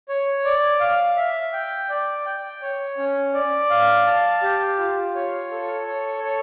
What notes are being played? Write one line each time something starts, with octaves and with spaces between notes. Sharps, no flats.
C#5
D5
F5
E5
G5
D5
G5
C#5
C#4
D5
F5
A5
G4
F4
C#5
A4
C#5
C#5